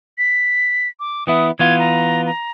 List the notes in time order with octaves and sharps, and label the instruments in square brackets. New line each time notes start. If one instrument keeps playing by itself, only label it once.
[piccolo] B6
D6
[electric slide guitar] E3 B3 E4 [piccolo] D#6
[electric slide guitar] E3 B3 F4 [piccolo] G#6
[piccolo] A#5
A#5